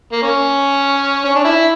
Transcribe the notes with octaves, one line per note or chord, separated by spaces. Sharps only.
A#3
C#4
C#4
D4
E4